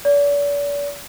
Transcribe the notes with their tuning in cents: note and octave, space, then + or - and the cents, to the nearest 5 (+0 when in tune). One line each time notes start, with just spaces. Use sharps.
D5 -40